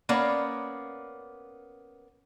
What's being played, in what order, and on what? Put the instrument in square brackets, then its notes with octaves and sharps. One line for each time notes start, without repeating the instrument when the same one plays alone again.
[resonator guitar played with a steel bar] A#3 B3 C#4 D5